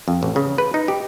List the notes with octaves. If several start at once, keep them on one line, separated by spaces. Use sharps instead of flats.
F2
A1
C#3
B4
D#4
G4